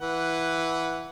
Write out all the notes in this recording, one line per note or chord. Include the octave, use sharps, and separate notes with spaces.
E3 B4 F#5